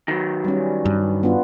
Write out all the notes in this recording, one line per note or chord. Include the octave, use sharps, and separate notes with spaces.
D#3 F#3
G3 C#4
G2
B3 D4 F4